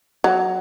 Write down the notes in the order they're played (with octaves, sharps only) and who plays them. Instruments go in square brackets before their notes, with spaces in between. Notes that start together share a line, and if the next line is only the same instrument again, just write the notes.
[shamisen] F#3